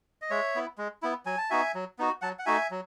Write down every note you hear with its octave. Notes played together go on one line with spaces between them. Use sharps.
D#5
G#3 C#5 E5
B3 E4
G#3
B3 E4
F#3 G#5
A5
B3 D#4 F#4 E5 G#5
F#3
B3 D#4 F#4
F#3 F#5 A5
F#5
A3 D#4 F#4 E5 G#5
F#3